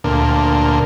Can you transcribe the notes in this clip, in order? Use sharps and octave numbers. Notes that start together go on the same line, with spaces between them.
D2 A#2